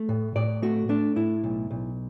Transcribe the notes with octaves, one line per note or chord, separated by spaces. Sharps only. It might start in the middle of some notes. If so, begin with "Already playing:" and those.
Already playing: A3
A2
A2 D5
A3 F#4
A3 D4
A2 E4
B1
B1